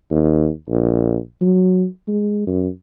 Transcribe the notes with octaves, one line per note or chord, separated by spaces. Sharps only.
D#2
A#1
F#3
G#3
F#2